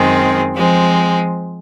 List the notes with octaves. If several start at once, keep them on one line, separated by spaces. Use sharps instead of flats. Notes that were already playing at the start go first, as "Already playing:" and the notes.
Already playing: F#2 D#3 G#3 C4
F3 G#3 C4